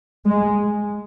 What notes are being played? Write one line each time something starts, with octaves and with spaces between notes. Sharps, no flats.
G#3